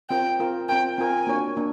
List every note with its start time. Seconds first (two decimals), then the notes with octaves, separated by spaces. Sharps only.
0.10 C4 F4 A#4 G5
0.40 C4 F4 A#4
0.69 C4 F4 A#4 G5
0.98 C4 F4 A#4 G#5
1.27 A#3 D4 F#4 A#4 C#5
1.57 A#3 D4